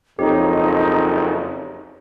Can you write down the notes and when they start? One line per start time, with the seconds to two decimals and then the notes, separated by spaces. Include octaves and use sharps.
0.19 F#1 F2 D#4 G4 C#5